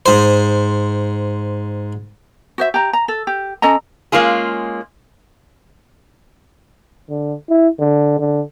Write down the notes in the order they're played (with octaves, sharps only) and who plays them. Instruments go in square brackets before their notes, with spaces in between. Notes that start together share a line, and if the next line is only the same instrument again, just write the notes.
[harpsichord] G#2 C5
[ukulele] F#4 C5 E5
G4 A#5
A#5
A4
G4
C#4 A4 D#5 A#5
[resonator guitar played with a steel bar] G#3 A#3 C#4 F4 G#4
[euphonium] D3
E4
D3
D3